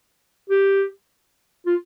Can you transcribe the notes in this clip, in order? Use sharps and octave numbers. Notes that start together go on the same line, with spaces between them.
G4
F4